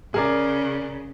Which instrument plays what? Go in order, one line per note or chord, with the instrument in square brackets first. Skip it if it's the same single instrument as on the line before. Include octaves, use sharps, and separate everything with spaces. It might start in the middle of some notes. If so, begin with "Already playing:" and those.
[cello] C#3 [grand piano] G#4 A#4 D5